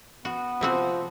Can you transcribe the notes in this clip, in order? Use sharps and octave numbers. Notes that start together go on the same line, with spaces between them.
B3 F#4
C3 F3 C4 F#4